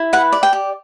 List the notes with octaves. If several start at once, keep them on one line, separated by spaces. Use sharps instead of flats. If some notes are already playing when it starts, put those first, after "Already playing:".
Already playing: E4
B4 F#5
D5
G5
G4